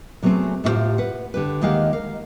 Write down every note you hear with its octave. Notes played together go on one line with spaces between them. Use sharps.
C3 F#3 A3 B3 C4 G#4
A2 C3 E4 F4 G4 C5
B4 F#5
D3 G4 B4
D#2 D#3 G#3 G4 F5 F#5
A#4 F5